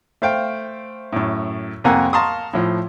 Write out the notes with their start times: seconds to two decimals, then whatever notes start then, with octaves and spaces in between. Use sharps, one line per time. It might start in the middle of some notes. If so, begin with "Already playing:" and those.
0.22 A3 C5 F5 G5
1.13 F#2 A2
1.84 C2 F2 A#3 F#5 G#5 A#5
2.13 F5 A5 A#5 C6 C#6 D#6
2.54 A2 F3